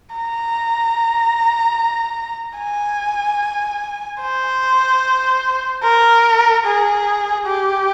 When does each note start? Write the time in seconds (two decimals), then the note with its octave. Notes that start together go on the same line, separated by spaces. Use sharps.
0.15 A#5
2.58 G#5
4.21 C5
5.83 A#4
6.65 G#4
7.46 G4